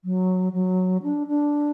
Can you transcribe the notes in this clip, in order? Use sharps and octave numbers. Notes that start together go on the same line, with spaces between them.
F#3
F#3
D4
D4